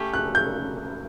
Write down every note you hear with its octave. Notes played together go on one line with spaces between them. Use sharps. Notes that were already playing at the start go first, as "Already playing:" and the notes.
Already playing: A3 C#4 G4
F#6
G6